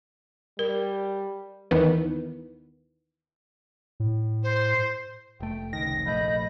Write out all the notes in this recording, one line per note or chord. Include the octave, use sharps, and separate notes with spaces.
G3 A#4
D#2 D#3 E3 B3
A2
C5
F1 A3 G5
F1 C#2 D#3 A#6
A#1 F3 A3 D#5 B5 G6